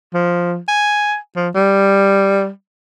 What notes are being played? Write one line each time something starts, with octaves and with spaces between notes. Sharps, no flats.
F3
G#5
F3
G3